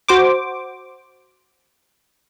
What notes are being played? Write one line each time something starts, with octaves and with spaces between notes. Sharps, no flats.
F#4 C5 D6